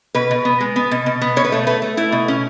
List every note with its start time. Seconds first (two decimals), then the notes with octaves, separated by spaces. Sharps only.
0.15 B2 B4
0.31 B2
0.45 B3
0.60 G#3
0.76 B3
0.91 B2
1.06 B2
1.22 B3
1.36 B2 C#5
1.44 B4
1.52 A3 C#5
1.67 A3 B4
1.82 A3
1.97 A3 E4
2.12 B2
2.28 C#4